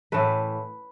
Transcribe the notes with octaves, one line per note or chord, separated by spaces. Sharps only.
A2 E3 A3 B4